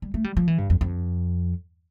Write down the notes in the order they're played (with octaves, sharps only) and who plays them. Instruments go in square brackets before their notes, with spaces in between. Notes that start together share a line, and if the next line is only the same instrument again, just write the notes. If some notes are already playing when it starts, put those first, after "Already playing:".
[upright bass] G3
A3
G3
F3
E3
G2
F2
F2